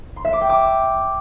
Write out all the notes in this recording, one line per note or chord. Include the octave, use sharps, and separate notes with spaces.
C6
E5
D6
G5
D6